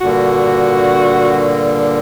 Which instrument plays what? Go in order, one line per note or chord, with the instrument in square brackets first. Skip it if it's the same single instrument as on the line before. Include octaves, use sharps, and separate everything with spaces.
[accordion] G2 A#2 D3 [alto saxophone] F#4